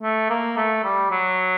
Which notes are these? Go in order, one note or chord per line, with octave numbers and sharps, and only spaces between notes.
A3
A#3
A3
G3
F#3